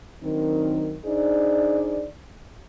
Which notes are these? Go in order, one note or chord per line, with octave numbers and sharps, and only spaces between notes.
D#3 F#3 C4 D4 D#4 A#4
D4 D#4 G#4 C5 D5